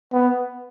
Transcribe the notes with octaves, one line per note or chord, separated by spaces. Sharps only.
B3